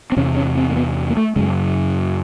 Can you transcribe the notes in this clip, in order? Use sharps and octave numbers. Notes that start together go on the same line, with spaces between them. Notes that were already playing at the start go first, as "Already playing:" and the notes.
C4
E2 C3 C#4
C#4
C4
A#3
B3
A#3
A3
F#2 C#3 G#3